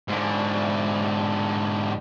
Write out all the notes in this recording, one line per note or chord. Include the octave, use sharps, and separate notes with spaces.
G#2 D3